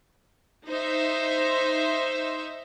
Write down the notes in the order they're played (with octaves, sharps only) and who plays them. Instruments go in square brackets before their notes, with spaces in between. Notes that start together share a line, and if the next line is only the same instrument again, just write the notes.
[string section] D#4 C5 E5